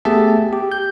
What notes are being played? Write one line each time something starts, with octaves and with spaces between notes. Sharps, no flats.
A3 B3 G4 G#4 E5 A5
G4
G6